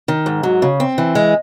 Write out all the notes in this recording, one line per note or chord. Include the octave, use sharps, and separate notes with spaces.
D#3
G#2
F#3
C#3
C4
E3
G#3